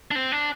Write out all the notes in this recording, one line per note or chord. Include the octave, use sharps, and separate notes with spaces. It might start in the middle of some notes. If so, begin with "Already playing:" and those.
D4
C4
D4